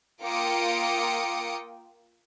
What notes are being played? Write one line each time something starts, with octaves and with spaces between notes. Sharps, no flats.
A#3 F4 G5 D6 D#6 C#7